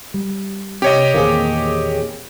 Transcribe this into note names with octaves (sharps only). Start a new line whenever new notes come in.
G3
C3 G4 C#5 D#5
E2 A#2 D#3 A#3 C4 G#4